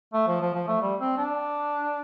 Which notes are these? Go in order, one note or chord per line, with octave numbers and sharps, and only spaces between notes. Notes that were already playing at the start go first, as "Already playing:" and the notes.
A3
F3
F3
F3
A3
G3
C4
D4